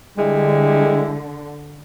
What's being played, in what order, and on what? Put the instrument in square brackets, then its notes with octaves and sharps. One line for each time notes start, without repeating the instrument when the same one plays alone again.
[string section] D3 [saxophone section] G3 G#3 E4